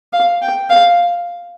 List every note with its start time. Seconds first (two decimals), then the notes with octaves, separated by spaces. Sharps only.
0.13 F5
0.42 G5
0.70 F5